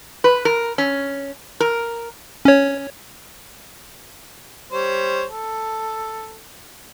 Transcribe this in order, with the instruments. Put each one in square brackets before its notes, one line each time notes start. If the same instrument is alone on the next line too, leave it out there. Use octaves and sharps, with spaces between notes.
[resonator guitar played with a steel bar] B4
A#4
C#4
A#4
[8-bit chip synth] C#4 C#5
[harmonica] G3 C5 C#5
A4